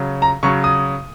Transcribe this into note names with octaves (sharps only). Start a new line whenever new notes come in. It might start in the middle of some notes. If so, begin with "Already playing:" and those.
Already playing: C#3 F#3
A#5
C#3 F#3 C#6
D#6